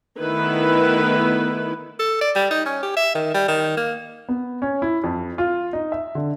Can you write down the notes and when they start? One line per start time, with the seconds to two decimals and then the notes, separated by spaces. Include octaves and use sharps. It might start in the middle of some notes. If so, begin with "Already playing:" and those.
0.19 D#3 A3 B3 E4 B4
1.99 A4
2.21 D5
2.36 G3
2.51 D#4
2.66 C#4
2.83 G4
2.97 E5
3.15 D#3
3.34 G3
3.48 D#3
3.77 A#3
4.29 B3
4.62 C#4
4.82 E4
5.04 F2
5.38 F4
5.73 D#4
5.92 E5
6.15 D3